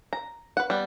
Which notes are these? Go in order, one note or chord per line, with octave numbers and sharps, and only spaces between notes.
A#5
B4 F#5
G3 B3